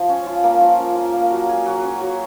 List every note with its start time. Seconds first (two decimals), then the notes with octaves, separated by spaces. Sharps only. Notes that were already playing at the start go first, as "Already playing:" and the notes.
Already playing: F3
0.09 C#4
0.26 F4
0.44 A#3
0.61 F3
0.79 C#4
0.96 F4
1.13 A#3
1.31 F#3
1.49 G#4
1.66 F#3
1.83 C#4
2.01 F#3